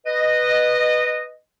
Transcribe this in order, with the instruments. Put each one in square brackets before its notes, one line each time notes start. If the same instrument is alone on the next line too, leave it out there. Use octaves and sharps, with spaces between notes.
[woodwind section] B4 D#5